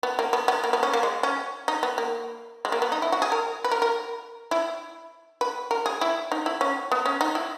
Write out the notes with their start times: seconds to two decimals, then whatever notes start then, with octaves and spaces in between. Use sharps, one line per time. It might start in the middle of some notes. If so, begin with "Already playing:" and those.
0.03 B3
0.19 A#3
0.33 B3
0.48 B3
0.64 A#3
0.73 B3
0.83 C#4
0.93 A#3
1.03 G#3
1.23 C#4
1.68 D#4
1.83 B3
1.98 A#3
2.65 G#3
2.72 A#3
2.82 B3
2.92 D#4
3.02 E4
3.12 F#4
3.22 G#4
3.32 A#4
3.64 B4
3.71 A#4
3.82 A#4
4.51 E4
5.41 B4
5.71 A#4
5.86 G#4
6.01 E4
6.32 D#4
6.46 E4
6.61 C#4
6.92 B3
7.06 C#4
7.21 D#4
7.35 E4